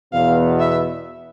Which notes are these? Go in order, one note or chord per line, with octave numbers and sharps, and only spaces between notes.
E2 B2 B3 F5
E5